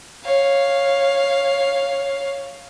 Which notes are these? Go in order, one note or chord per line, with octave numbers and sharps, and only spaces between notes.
C#5 F5